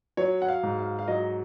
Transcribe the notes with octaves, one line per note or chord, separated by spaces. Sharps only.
F#3 C#5
F#5
F5
G#2
F5
F5
F#3 D#5